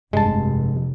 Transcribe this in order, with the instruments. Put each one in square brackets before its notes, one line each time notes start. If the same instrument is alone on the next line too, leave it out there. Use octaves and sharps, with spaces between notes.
[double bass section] F1 [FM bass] G2 [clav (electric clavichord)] G#3 A5